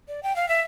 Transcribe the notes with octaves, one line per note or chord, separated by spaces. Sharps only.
D5
G5
F5
E5